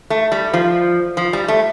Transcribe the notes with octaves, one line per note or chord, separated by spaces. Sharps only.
A3
G3
F3
F3
G3
A3